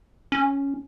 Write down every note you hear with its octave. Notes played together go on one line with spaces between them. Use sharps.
C#4